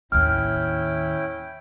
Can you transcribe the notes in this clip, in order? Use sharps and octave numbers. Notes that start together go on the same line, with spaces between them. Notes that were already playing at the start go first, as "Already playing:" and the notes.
D#2 A2 C#4 E4 G5 F6